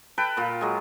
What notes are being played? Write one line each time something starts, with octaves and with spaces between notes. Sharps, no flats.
A4 B4 G5
A#2 F4
F#3 G#3